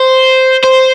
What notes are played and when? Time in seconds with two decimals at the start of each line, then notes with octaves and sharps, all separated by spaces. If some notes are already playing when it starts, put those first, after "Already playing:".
Already playing: C5
0.64 C5